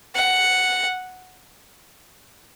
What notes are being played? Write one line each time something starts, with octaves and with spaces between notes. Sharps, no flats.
F#5